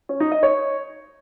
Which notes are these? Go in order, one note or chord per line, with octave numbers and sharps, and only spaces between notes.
C#4
D#4
D#5
C#5